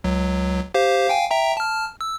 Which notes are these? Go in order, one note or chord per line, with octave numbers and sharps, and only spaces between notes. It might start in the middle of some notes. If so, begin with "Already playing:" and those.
C#2 F#3
G4 C5 F5
F5 G5 G#5
E5 G5 A#5
A5 F6
E6